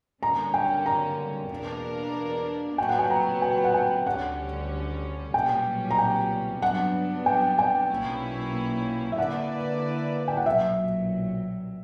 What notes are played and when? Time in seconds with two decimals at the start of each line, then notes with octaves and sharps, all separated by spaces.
0.22 G2 D3 A#3 C#4 A#5
0.54 G5
0.86 A#5
1.50 E2 B2 A#3 D4 A#4
2.78 A#2 F#3 B3 G5
2.89 F#5
2.99 G5
3.10 A#5
3.42 G5
3.64 F#5
3.74 G5
4.06 D2 D3 G3 C#4 F#5
5.34 B1 A#2 G3 C#4 G5
5.91 A#5
5.98 G5
6.62 G2 F#3 B3 D4 F#5
7.26 G5
7.59 G5
7.90 B1 A#2 A#3 C#4 E4
9.12 E5
9.18 D3 A#3 E4 B4 D5 F#5
10.28 G5
10.37 F#5
10.46 B1 A#2 F#3 E5